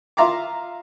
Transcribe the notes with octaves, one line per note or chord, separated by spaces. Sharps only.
F4 E5 F5 A#5 C6 D6